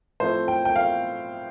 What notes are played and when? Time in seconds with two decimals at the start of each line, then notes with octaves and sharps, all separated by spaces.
0.20 A2 F3 A3 C4 C5
0.48 G5
0.65 G5
0.76 F5